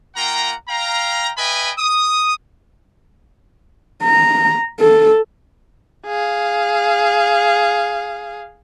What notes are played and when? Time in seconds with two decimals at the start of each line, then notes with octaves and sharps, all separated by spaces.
0.16 A#3 F4 F#5 G5 A#5
0.69 F5 G5 A#5
1.38 B4 D#5 E5 G5 G#5 B5
1.78 D#6
4.04 A#5
4.80 A4
6.07 G#4 F5